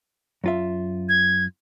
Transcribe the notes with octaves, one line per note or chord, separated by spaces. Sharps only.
F#2 F4 E5
G#6